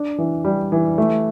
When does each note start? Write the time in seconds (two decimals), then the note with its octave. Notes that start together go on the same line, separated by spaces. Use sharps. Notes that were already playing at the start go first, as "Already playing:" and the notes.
Already playing: D4
0.18 E3
0.44 G3
0.72 E3
0.98 A3